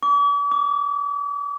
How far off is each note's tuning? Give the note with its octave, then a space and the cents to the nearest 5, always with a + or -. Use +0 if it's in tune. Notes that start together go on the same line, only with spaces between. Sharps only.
D6 -45
D6 +15